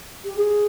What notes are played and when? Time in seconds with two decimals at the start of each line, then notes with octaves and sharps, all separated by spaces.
0.24 G4
0.36 G#4